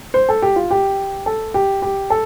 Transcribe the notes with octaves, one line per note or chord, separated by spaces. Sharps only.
C5
A4
G4
F4
G4
A4
G4
G4
A4